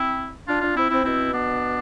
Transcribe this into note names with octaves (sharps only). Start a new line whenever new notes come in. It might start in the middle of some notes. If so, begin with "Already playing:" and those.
Already playing: C4 E4
D4 F4
D4 F4
C4 E4
C4 E4
B2 C4 E4
B3 D4